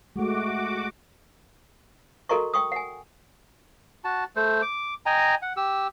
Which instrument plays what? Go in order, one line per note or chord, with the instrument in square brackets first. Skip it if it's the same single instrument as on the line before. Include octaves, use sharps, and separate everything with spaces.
[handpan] G#3 A3 [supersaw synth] F#4 D6
[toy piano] F#4 A4 A#4 D#5 A#5 C#6
G5 C#6 D#6
F#5 G#5
[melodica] F#4 A5
A3 C5
D6
D#5 G5 G#5 A#5
F#5
G4 E6